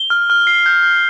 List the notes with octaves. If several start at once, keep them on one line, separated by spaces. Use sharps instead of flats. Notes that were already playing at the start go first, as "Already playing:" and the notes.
Already playing: G7
F6
F6
C7
G6
G6